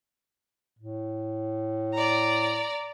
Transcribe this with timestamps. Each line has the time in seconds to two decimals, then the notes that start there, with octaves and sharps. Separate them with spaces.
0.79 A2
1.94 D5 A#5